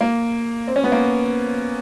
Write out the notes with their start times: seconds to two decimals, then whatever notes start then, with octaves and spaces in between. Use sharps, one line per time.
0.01 A#3
0.68 C4
0.76 C#4
0.84 B3
0.92 A#3